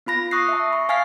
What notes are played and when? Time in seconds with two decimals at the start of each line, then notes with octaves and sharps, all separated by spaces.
0.06 B3 F4 B5 A#6
0.31 C#6 D#6 F#6 A#6 C7
0.49 E5 A5
0.72 B5 C#6
0.89 F5 G#5 F6 A6 C7